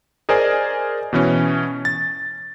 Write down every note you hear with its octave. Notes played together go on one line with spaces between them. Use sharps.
G#4 A#4 C5 D5 D#5 G#5
B2 E3 C#4
A6